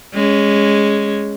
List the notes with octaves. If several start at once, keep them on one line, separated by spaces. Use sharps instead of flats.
G#3 C#4